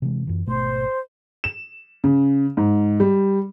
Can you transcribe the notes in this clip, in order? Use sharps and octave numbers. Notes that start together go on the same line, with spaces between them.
C3 E3 G#3
F#2 E3
G#1 B2 A3 C5
E7
C#3
G#2
G3